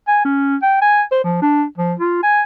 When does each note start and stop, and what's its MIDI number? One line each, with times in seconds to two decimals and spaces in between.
0.08 0.25 80
0.25 0.56 61
0.62 0.77 79
0.81 1.02 80
1.12 1.23 72
1.24 1.42 53
1.42 1.64 62
1.78 1.94 53
1.99 2.22 65
2.23 2.42 80